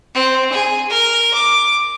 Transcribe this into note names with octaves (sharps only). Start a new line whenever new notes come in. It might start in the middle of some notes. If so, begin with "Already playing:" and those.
C4
G#4
A#4
D6